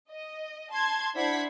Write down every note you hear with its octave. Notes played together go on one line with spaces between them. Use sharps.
D#5
A5 C6 G#6
D4 E4 C5 F#5 G#6 B6